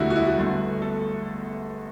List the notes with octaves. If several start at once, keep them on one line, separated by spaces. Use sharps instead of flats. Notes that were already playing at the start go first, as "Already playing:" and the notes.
Already playing: E1 D2 D3 G3 E4 F#4 A4
F#4
E4
F#4
G1 G2 D3 A3
A4